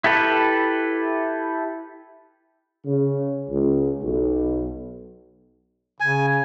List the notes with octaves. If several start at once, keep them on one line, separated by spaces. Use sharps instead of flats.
E4 G4 A4 B4
C#3
C#2
B1
C#3 G#5